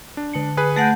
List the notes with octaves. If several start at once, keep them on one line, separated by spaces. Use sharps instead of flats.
D4
D3 A5 C#7
G#4 B4
A3 F#5 G6 A6 A#6 D7